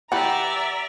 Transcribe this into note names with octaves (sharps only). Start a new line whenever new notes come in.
E3 G4 B4 D5 E5 F#5 A#5